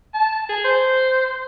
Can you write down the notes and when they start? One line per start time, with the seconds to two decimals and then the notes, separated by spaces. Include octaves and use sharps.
0.14 A5
0.49 G#4
0.64 C5